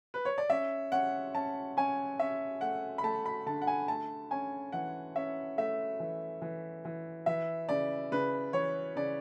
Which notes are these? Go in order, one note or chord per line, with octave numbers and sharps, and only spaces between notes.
B4
C#5
D5
C#4 E5
C#4 F#5
C#4 A5
C#4 G#5
C#4 E5
A3 F#5
B5
A3 A5
B5
D3 A5
F#5
G#5
A3 A5
C#4 G#5
E3 F#5
C#4 E5
A3 E5
E3
E3
E3
E3 E5
C#3 D5
C#3 B4
E3 C#5
C#3 D5